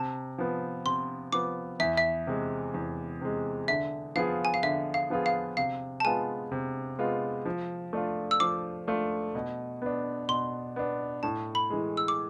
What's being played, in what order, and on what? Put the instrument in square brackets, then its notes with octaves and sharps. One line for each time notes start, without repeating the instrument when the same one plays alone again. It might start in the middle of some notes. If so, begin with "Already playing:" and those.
Already playing: [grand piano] C3 [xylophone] A5
[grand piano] F3 B3
[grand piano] C3 [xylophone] C6
[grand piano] F3 B3 [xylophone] D6
[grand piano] E2 [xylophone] E5
[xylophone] E5
[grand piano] C3 G#3
E2
C3 G#3
[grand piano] D3 [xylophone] E5
[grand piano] F3 B3 F4 G#4 [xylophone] F5
[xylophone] G#5
F5
[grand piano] D3 [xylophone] E5
[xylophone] F5
[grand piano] F3 B3 F4 G#4
[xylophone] F5
[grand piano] C3 [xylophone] F5
[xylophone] A5
[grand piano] G#3 B3 F4 [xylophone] G#5
[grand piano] C3
G#3 B3 F4
F3
A3 D4 F4
[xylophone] E6
[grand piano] F3 [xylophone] D6
[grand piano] A3 D4 F4
B2
B3 D4
[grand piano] B2 [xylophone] C6
[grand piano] B3 D4
[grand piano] A2 [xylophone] A5
[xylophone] B5
[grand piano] E3 G#3
[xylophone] E6
D6